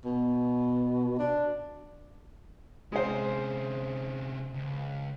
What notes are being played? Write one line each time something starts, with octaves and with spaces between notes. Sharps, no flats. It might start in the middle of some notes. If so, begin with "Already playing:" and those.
B2
D4
C3 G#3 C#4 C5
C#2